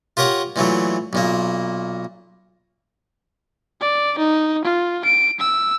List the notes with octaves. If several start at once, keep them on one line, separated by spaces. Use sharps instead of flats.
F4 G4 A#4 C#5 F#5
A#2 E3 F#3 A3
B1 A#2 A#3
D5
D#4
F4
D7
E6